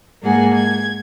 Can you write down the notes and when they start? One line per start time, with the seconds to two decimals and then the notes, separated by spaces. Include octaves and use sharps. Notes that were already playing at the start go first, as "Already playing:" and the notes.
0.22 G#2 A#3 G#4 F#5 G#5
0.54 G#6